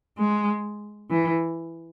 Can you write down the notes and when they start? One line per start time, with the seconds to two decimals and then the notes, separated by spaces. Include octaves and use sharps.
0.18 G#3
1.10 E3